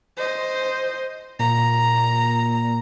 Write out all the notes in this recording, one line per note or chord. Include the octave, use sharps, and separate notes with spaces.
C5 D#5
A#2 A#5